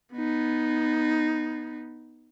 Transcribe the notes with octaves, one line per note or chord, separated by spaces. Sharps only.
B3 D#4